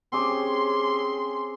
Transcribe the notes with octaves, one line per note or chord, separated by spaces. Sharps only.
C4 C#4 G#4 C6 D6